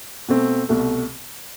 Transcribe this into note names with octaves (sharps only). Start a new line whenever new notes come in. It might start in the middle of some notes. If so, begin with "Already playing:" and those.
B2 A3 C4
C2 B2 A3